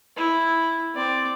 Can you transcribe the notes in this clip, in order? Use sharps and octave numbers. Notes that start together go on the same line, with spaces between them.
E4
C4 D5